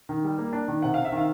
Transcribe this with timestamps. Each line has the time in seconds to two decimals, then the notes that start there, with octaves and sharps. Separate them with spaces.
0.09 D#3
0.24 G3
0.38 A#3
0.53 D4
0.68 D#3
0.82 C3 F#5
0.94 C3 F5
1.05 E5
1.12 D#3 F5